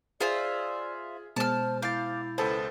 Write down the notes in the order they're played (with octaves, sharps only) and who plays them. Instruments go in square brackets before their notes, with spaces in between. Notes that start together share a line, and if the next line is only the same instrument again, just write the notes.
[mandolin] F4 C5 E5 [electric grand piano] G#4 [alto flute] D5
[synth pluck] B2 G#3 [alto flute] C5 [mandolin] A5 F6
[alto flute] E4 [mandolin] F5 D6 [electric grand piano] G6 A6
[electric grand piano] C#2 A4 C5 [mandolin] B3 A5